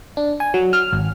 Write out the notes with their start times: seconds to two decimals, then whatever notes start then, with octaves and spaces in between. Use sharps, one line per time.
0.17 D4
0.40 G#5
0.54 F#3
0.73 F6
0.93 G#1